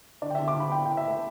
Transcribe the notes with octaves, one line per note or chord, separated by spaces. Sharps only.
D3 D5
G5
E5
D3
D6
D3
B5
E4 G5
E4 G5
E5
A3